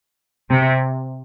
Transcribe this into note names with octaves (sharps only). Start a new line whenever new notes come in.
C3